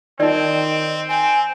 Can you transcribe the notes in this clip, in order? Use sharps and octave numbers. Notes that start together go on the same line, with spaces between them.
D#3 C4 D#4 D5 D#5
C4 G#5